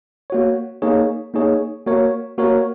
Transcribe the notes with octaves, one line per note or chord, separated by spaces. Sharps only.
A#3 F#4 C#5
A#3 D#4 G#4 C#5
A#3 D#4 G#4 C#5
A#3 F#4 A#4 C#5
A#3 F#4 A#4 C#5